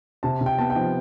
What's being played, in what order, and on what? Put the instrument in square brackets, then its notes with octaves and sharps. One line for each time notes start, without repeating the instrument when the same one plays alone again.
[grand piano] C3 A5
C3
G5
B3 A5
G5
F3